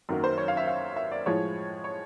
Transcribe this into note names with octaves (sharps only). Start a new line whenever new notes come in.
F#2 D#3 F#3 A#3
C5
C#5
F5
E5
F5
E5
D5
A2 F3 G#3 C#5
C#5